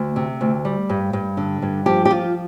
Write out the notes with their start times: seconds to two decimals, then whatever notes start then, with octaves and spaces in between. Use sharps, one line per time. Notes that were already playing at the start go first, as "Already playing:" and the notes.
Already playing: D2
0.16 C3
0.41 D2
0.65 G3
0.89 G2
1.13 G2
1.37 D3
1.62 G2
1.86 F3 G4
2.05 G4
2.10 F3 F4